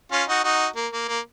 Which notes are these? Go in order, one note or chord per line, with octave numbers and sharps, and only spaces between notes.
C#4 F4
D#4 F#4
D#4 F#4
A#3
A#3
A#3